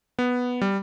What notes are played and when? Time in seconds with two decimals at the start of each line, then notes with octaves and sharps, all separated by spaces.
0.19 B3
0.61 G3